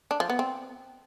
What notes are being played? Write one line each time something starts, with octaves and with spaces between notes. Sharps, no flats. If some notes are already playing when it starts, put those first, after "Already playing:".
D4
F3
B3
C4